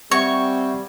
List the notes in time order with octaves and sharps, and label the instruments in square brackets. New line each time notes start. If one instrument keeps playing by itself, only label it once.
[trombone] G3 [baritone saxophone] C4 [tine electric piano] E5 F#5 G#6 [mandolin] C#6